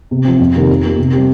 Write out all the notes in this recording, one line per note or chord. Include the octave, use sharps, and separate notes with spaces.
C3
F3 C4
F2
C3 D#3 A#3 G4
F3
A#3 G4
C3
G3 C4 G4